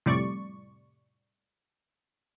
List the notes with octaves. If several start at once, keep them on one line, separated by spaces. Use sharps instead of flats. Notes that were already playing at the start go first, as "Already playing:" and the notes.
F2 A2 C3 G3 D5 C#6